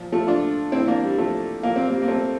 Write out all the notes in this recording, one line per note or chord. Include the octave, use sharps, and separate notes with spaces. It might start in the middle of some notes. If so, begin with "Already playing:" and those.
Already playing: A#2 F3
F3 A3
D4 F4
A2 E3 C4 E4
A#3 D4
G3
F3 A3
A#2 F3 A#3
C4
G3 A#3
A#3
A3 C4